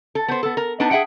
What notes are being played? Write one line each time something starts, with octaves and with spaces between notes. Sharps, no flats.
A4
B3 C5
B3 A4
A#4
B3 D4 D#4 A5
G#4 E5 F#5 G5